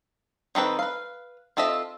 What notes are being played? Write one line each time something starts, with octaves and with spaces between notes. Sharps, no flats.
D#3 C4 A4 B4
B4 F5
C4 F4 A4 D#5 E5